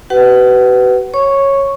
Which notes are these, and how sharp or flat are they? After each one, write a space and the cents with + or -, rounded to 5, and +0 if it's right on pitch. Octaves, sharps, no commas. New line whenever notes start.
F#4 +45 B4 +15 F#5 +30
C#5 -10 C#6 +0